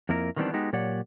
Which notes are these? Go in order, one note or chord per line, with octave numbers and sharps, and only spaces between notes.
F2 A#3 E4 A#4
D#3 E3 G3 B3 C4 D4
G#3 B3 D#4 F#4 G4
A#2 F#3 G4 C#5 D5 F#5